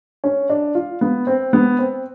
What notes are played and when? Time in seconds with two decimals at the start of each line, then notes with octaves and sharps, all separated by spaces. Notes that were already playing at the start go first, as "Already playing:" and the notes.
0.24 C#4
0.49 D4
0.75 F4
1.01 B3
1.27 C4
1.53 B3
1.79 C4